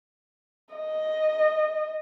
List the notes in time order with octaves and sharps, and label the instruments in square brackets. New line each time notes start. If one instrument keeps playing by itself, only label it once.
[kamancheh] D#5